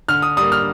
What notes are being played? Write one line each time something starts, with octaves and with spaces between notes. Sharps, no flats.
D3 F6
D#6
G3 A#3 D#6
F6